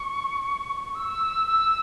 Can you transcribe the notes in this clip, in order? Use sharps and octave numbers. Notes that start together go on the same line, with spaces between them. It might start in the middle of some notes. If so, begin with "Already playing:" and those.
Already playing: C#6
E6
E6